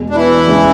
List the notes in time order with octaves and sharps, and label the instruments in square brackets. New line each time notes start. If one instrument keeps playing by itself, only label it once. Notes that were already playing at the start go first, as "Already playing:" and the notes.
Already playing: [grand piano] E2 B2 G#3
[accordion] D4
E3 E4
[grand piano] E2 C#3 G#3 D4